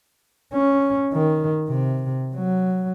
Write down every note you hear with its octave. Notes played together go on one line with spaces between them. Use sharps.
C#4
D#3
C3
F#3